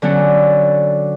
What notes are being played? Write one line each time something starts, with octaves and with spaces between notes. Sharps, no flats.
D3 F#3 C#4 D4